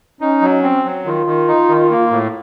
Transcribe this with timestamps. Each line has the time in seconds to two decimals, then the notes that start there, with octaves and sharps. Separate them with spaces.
0.21 C#4 D#4
0.41 F#3
0.63 C4
0.85 F#3
1.05 D#3 F4
1.27 D#3
1.48 D#4
1.69 D#3
1.90 A#3
2.11 A2